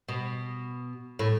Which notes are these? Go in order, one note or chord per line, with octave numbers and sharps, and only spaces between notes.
B2
A2